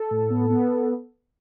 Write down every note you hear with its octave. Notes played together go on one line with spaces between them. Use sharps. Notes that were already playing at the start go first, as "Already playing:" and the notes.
Already playing: A4
A2
B3
B3